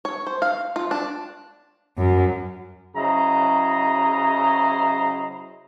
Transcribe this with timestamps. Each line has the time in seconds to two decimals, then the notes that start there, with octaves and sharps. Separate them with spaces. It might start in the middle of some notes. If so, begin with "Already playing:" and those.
0.05 C#5
0.27 C5
0.42 F5
0.76 F4
0.91 D4
1.98 F#2
2.96 C#3 F#3 E4 C5 D#5 A#5